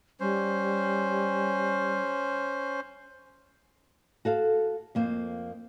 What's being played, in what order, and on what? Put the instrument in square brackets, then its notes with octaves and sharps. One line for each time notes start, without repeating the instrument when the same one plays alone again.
[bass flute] G3 [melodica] C#4 C5
[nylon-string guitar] F#4 A4 F5
F2 A#3 C5